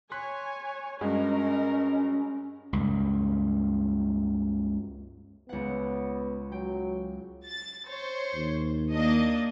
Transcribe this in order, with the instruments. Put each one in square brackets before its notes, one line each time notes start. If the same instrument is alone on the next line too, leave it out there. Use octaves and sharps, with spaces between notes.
[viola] C#5 G#5 [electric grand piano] C6 F#6 B6
[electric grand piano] G2 G#3 F#4 [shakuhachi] C#4 [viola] A#4 [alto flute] D#5
[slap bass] C#2 G2
[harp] C#2 F#5 [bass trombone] B3
[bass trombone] F#3 [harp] G5
[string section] A6
C5 C#5
[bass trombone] D#2
[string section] A#3 D4 D#5